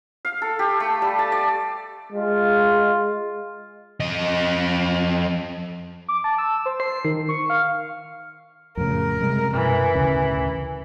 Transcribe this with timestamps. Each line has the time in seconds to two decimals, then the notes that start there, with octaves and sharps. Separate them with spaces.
0.25 F5
0.42 A4
0.59 G4
0.80 A3
1.02 G3
1.19 A5
1.32 D5
2.12 G#3 F4
4.00 F2 D#5
6.08 D6
6.24 A5
6.38 E6
6.66 C5
6.80 C7
7.05 D#3
7.29 C#6
7.50 F5
8.77 F2 A2 C#3 A#4
9.21 C3 G3 G#3
9.54 F#2 B2 E3
9.95 A1 D2 C#3